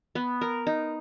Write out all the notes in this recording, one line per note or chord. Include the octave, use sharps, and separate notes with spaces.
B3
A#4
D#4